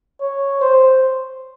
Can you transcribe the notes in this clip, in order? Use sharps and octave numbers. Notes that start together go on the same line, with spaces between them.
C#5
C5